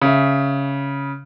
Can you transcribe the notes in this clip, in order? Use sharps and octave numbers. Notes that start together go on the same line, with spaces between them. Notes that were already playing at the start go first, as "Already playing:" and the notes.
C#3 E5